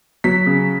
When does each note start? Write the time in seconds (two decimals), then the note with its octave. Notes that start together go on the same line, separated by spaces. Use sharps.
0.24 F#3 B6
0.46 C#3